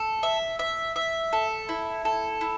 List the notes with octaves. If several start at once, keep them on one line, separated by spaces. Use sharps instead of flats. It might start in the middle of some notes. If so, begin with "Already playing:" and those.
Already playing: A4
E5
E5
E5
A4
E4
A4
E4